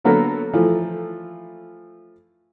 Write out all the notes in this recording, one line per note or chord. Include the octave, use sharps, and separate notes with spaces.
D3 F#3 A#3 B3 A4 A#4
E3 F3 A3